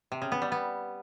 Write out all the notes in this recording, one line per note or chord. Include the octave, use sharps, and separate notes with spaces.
C3
C#3
B3
G3
B3